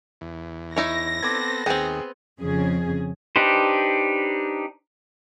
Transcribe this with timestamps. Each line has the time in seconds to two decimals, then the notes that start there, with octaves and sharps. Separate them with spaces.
0.21 E2
0.76 D#4 E4 C#5 A#6
1.23 B3 C4 A4 D6 G#6
1.66 D#2 B3 C4 G#4 G5 D#6
2.40 F2 C#3 G#4
3.36 D4 D#4 G4 B4 C5